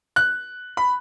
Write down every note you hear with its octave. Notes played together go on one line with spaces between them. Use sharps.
F#6
B5